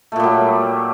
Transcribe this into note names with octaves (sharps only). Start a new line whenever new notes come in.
A#2 F#3 G3 A3